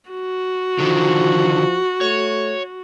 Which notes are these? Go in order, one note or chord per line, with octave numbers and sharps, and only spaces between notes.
F#4
D3 D#3 F3
A3 C#5